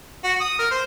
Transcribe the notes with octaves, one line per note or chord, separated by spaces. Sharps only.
F#4
D#6
A#4
C5